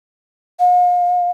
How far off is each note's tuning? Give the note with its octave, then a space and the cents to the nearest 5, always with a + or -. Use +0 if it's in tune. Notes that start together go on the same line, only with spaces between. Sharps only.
F5 +40